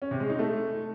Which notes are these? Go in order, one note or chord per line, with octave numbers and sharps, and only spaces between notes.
C#4
C3
G#3
D#4
A3